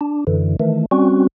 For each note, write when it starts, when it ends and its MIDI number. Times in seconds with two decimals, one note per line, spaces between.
0.01 0.24 62
0.27 0.56 42
0.27 0.56 50
0.27 0.56 52
0.60 0.86 51
0.60 0.86 52
0.60 0.86 57
0.91 1.27 55
0.91 1.27 60
0.91 1.27 61
0.91 1.27 66